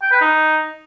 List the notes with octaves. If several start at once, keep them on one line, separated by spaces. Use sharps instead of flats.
G5
B4
D#4